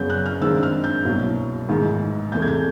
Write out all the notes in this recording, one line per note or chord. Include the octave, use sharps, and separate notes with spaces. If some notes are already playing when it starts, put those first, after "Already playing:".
Already playing: F#2 C#3 F#3 B3 G6
F#6
F6
G2 D#3 G#3 C4 E6
F6
G6
C2 B2 F#3 A#3
A1 G#2 D#3
E2 C3 E3 A3 G6
G#6
G6